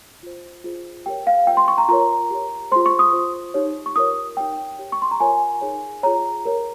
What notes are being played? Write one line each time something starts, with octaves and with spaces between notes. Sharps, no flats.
F4 C5
F4 G#4 C5
G4 A#4 C#5 G5
F5
F4 C5 G5
C6
C#6
A#5
F4 A#4 C#5 A#5
G4 C#5
F4 G#4 C5 C6
C#6
D#6
F4 C5
D#4 G4 C#5
C#6
F4 A#4 C#5 D#6
D#4 G4 C#5 G5
G4 C#5
C#6
C6
A#5
F4 A#4 C#5 G#5
D#4 G#4 C#5
F4 G#4 C#5 A#5
G4 A#4 C#5